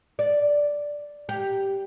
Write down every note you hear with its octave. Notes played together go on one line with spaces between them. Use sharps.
D5
G4